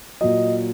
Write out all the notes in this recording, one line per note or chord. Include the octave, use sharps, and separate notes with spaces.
A#2 F#3 D#5